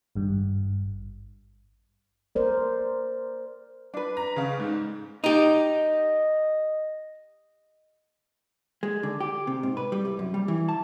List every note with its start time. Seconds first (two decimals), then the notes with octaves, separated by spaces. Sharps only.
0.15 G#1 G2
2.35 A#4 C5 D5
3.94 D4 B4
4.17 A#5
4.36 C#3 F5
4.60 G#2
5.24 D#4 G4 D#5
8.83 G#3
9.03 D3
9.20 G4
9.47 C3
9.63 G#2
9.77 B4
9.92 G3
10.05 C2
10.19 F#2
10.34 G3
10.48 E3
10.69 A5